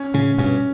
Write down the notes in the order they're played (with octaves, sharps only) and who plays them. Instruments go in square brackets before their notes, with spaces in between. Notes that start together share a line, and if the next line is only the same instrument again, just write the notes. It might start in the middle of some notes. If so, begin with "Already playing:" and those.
Already playing: [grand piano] C#4
[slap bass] A2 C#3 [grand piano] C#4
[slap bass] G2 B2 [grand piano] C#4